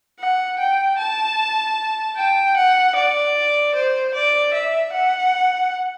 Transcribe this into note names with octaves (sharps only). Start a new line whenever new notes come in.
F#5
G5
A5
G5
F#5
D5
C5
D5
E5
F#5